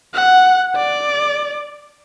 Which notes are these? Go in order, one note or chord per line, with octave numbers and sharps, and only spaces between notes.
F#5
D5